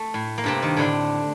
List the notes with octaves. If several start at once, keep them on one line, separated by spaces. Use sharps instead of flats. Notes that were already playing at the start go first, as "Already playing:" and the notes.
Already playing: A3
A2
A#3
G2 C3 C4
D#3
A2 D3 D4